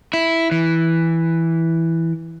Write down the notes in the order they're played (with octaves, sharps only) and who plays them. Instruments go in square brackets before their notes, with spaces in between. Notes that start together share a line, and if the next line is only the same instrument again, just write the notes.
[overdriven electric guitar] E4
E3